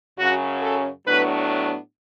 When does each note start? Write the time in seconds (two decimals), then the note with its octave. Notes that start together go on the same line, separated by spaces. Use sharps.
0.18 F#2 C#3 F#3 C#4 F#4
0.61 A4
1.06 A2 F#3 B3 D4 B4